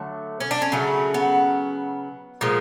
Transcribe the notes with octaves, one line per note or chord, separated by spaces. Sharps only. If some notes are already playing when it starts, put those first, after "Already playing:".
Already playing: D3 F#3 A3
C#4
D4
C#4
C#3 F#3 A3
B3
A#2 F3 G#3